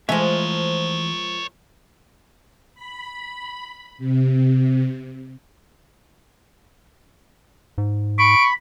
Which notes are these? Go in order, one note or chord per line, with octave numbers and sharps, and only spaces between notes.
E3 F3 G#3 A3 A#4 C#5 E5
B5
C3
G#2
B5 C#6 D7